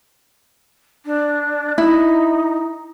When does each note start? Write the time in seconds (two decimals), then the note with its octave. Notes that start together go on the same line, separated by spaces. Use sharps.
1.06 D4
1.78 D#4 E4